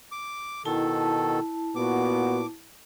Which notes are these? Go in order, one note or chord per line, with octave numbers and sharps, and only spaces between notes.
D6
B2 D#3 E4 A4 A5
A#2 B3 F#4 D6